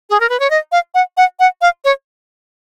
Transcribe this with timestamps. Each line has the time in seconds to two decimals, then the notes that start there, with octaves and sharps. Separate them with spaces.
0.10 G#4
0.20 A#4
0.29 B4
0.40 C#5
0.50 D#5
0.72 F5
0.94 F#5
1.17 F#5
1.40 F#5
1.61 F5
1.85 C#5